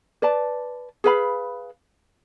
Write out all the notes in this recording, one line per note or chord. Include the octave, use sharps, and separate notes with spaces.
B4 D5 A5
G#4 B4 F5 B5